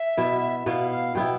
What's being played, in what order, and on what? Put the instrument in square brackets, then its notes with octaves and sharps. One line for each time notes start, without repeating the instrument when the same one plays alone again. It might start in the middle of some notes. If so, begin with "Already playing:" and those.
Already playing: [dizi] E5
[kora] B2 B3 E4
[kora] B2 B3 E4 [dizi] F5
[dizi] F5
[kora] B2 B3 E4 [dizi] G5